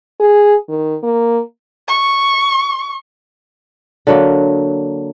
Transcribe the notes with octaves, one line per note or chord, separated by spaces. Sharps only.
G#4
D#3
A#3
C#6
D3 F#3 A#3